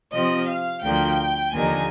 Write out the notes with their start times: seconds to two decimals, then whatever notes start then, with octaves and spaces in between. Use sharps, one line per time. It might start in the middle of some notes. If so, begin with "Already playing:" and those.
0.12 C3 F3 C4 D#5
0.47 F5
0.83 D2 D3 F3 A#3 G5
1.53 D#2 D3 F3 A#3 D#4 G#5